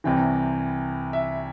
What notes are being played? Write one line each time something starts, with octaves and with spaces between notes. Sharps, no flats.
C2 C3 E3 G5
E5